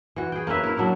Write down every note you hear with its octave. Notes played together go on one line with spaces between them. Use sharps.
E3 F#4
G#4 G5
A#3 C#4 B4 E5
E4 A#4
F#3 D4 E4